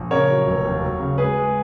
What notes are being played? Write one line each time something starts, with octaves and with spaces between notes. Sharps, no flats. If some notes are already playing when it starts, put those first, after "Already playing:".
Already playing: A#1
C#3 A#4 C#5
F#3
F1
D#2
F#3
C#3
G#3 G#4 B4
G#3